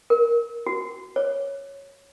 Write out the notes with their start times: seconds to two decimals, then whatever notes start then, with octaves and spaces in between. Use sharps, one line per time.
0.10 A#4
0.67 F#4
1.16 C#5